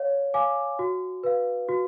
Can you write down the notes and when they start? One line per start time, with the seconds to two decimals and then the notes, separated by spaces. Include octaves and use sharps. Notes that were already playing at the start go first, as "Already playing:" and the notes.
Already playing: C#5 F5
0.34 F5 G#5 D6
0.79 F#4
1.23 B4 F5
1.69 F#4